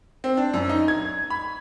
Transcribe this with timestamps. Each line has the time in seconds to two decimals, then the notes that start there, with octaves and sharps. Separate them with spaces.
0.24 C4
0.37 D4
0.54 F#2
0.69 D#4
0.88 G#6
1.30 B5